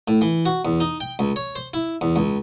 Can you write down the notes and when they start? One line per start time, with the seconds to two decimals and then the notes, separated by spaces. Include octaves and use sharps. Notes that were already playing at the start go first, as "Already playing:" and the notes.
0.08 A2
0.21 E3
0.46 F#4
0.65 E2
0.80 D#4
1.00 G5
1.19 C#2
1.36 C#5
1.56 C5
1.74 E4
2.01 E2
2.16 C#2